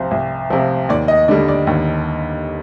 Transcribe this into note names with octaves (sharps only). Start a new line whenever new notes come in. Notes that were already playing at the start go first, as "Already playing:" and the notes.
Already playing: C2 C3 F3 C5
C2
C3 F3
D#2 D5
D#5
D3 G3 D5
D5
D#2